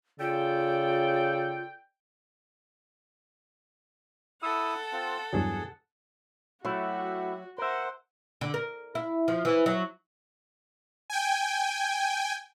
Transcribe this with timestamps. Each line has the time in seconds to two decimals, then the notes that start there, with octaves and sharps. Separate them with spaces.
0.20 C#3 F4 A4 D5 G5
4.42 E4 A4 F#5 D#6 E6
4.92 C4 F4
5.33 E2 G2 F#3 G#4
6.65 F#3 A3 E4 F#4 G4 E5 F#5
7.58 A#4 C5 E5 F#5
8.41 D3
8.54 A#4
8.95 E4
9.28 F3
9.45 E3
9.66 F#3
11.10 G5 G#5